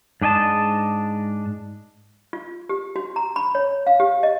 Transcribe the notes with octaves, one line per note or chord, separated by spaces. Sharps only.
G#2 D4 D#5 G#5 A5
F4
G4
F#4
A#5
B5
C#5
F5
G4
D#5